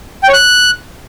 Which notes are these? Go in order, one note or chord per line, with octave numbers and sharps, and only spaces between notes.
G5
C#5
F#6